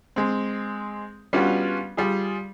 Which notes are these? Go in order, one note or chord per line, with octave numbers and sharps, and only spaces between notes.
G#3 C4
G3 B3 C#4 D4 F4 F#4
G3 F4 G#4